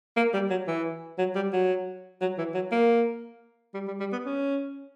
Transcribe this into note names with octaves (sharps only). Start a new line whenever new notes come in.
A#3
G3
F#3
E3
F#3
G3
F#3
F#3
E3
F#3
A#3
G3
G3
G3
B3
C#4